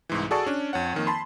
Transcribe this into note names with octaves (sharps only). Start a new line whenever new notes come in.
C2 G#2 E3
F#4 G#4 A4 D5 A5 C#6
C#4 D4
F2 C#5 F#5
F2 D#3 A#3
A5 B5 C6